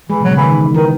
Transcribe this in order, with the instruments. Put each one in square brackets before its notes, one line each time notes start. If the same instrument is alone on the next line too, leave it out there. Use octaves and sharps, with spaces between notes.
[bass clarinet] E3 [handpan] G#3
[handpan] B2
[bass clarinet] F#3
[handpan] C#3
[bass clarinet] E3
[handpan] D#3
[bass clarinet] D#3 [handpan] E3